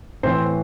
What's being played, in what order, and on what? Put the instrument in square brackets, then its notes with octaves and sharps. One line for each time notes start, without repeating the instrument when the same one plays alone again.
[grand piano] A2 E3 C4 C5